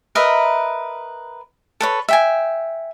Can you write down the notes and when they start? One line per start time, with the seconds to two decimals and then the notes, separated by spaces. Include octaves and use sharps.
0.15 A#4 B4 D#5 E5
1.81 A4 B4 C#5
2.09 E5 G5 G#5